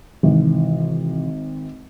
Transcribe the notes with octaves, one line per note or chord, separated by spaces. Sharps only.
G#1 C3 E3